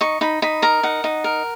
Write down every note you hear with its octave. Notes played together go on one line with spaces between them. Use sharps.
D#4 C#6
D#4 B5
D#4 B5
A#4 A#5
D#4 F#5
D#4
A#4